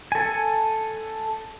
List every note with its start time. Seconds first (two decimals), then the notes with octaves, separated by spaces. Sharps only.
0.12 A4 G#5